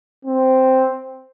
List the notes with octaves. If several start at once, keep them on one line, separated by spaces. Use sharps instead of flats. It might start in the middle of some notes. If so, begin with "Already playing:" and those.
C4